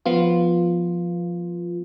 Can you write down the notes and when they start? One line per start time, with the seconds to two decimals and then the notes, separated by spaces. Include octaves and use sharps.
0.06 F3 B3 F4